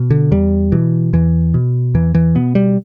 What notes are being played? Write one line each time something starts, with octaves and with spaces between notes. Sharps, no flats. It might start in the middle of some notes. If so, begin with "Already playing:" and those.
Already playing: B2
D3
E2 G3
B2 E3
E2 E3
B2
E2 E3
E3
B2 B3
G3